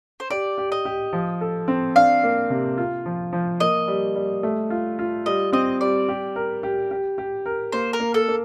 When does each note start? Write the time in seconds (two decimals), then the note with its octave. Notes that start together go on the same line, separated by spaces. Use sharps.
0.20 C5
0.30 G4 D5
0.58 G4
0.72 D#5
0.85 G4
1.13 F3
1.41 A4
1.68 C4
1.95 D4 F5
2.23 A#3
2.50 C3
2.78 F4
3.06 F3
3.33 F3
3.60 A#3 D#5
3.88 G3
4.15 G3
4.43 A3
4.70 F4
4.99 F4
5.26 G3 D#5
5.53 C4 D#5
5.81 G3 D5
6.08 G4
6.36 A#4
6.63 G4
6.91 G4
7.18 G4
7.46 A#4
7.72 A#3 C5
7.93 A#4
8.00 A#3
8.14 A4
8.28 A#3